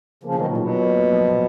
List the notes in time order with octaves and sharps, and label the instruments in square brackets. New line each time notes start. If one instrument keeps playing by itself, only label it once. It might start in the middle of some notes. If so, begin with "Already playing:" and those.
[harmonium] C#3 F3 [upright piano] A#3
[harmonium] B2 D#3 [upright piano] F#3
[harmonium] A#2
[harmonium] B2 [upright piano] F4
[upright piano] F#3
A#3
F#3
F3
A#2